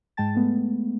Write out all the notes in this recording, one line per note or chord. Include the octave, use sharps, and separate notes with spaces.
G#2 G#3 G5 A5 A6
G#3 A3 B3